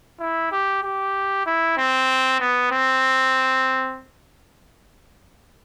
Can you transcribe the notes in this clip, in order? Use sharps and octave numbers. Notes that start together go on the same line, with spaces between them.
E4
G4
G4
E4
C4
B3
C4